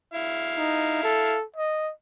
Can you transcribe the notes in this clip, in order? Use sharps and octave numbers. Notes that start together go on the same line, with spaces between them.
E4 F5
D#4
A4
D#5